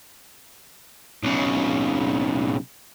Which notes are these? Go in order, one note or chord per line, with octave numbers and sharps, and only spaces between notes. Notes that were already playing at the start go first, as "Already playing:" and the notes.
B1 C#3